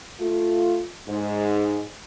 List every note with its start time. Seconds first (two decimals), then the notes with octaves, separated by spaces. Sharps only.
0.20 A3 F4
1.08 G#2